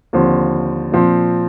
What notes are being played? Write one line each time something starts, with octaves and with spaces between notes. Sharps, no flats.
D#2 D3 F3 C4
A#2 F3 C4